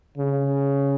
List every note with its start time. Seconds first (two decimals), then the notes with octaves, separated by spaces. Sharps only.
0.18 C#3